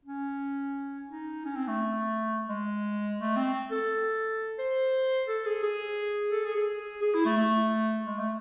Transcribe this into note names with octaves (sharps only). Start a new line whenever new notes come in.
C#4
D#4
C#4
C4
A3
G#3
A3
C4
A4
C5
A4
G#4
G#4
A4
G#4
G#4
G#4
E4
A3
A3
G#3
A3